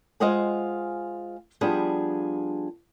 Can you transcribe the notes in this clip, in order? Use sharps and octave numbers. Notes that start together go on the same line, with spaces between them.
G#3 F4 C5 D#5 F#5 G#5
F3 G3 B3 D4 G#4